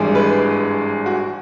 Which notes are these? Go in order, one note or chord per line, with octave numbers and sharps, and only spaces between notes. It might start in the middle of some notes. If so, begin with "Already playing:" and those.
Already playing: G#1 G2 E3 G#3
B4
F#4